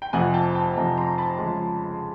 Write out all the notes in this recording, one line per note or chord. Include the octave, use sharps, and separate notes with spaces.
G5
F2 C3 F3 F#5 G#5
G5 A5
G5 A5
F2 C3 F3 G#5 A#5
A#5 C6
A5 B5
F2 C#3 F3 G#3